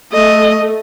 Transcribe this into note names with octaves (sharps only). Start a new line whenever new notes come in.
A3 D#5